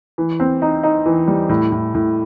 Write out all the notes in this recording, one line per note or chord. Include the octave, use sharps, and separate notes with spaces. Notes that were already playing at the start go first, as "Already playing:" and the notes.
E3
C4
D#4
D#4
E3
G3
A2
A2
A2